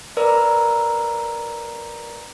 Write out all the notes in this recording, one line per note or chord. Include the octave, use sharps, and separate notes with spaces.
A#4 B4 D5 A#5 E6